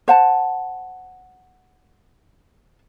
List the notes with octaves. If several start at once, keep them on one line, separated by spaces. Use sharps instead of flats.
C5 F#5 A5